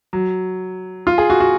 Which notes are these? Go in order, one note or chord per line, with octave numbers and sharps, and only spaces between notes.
F#3
F4
G#4
F#4
F#4